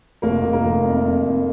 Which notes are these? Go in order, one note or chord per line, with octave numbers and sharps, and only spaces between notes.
F1 A#3 A#4
F1
A#3 A#4
F1
F2
F2
F2